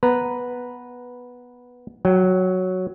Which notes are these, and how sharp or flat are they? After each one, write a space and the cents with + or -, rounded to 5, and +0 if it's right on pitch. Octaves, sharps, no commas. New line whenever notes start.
B3 -5 B4 +0 A#5 +0
F#3 +0 G5 -30